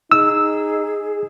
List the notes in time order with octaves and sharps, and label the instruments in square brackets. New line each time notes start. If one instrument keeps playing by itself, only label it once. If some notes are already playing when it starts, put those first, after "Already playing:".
[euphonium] D#4 [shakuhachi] G#4 [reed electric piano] E6